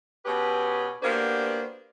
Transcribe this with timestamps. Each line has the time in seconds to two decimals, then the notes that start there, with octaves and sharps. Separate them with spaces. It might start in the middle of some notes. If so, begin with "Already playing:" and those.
0.25 B2 C#4 G4 G#4 B4
1.03 A#3 B3 D4 F#4 G4 C5